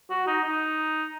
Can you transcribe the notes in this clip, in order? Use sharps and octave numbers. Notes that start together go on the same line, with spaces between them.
F#4
D#4
D#4